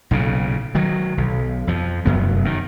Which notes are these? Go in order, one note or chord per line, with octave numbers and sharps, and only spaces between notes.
B1 A#2 C#3
D#3 F#3
B1
F2 F3
F1 F#2 B3
F#2 D#3